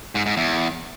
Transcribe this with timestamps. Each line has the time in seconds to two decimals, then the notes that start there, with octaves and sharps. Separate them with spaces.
0.15 G#2
0.26 G#2
0.37 E2